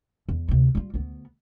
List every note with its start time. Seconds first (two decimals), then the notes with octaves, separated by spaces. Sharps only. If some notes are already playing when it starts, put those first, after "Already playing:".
0.29 E2
0.48 D2 C3
0.75 G3 F4
0.94 D2 B3